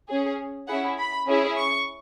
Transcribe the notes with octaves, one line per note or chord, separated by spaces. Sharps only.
C#4 G#4
C#4 E4 G#4 F#5
B5
C#4 E4 G#4
C#6